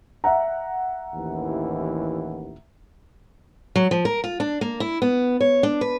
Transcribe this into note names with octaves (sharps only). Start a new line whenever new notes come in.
E5 F#5 A#5
A1 D#2 E3
F#3
F3
A#4
F4
D4
A#3
E4
B3
C#5
D4
B4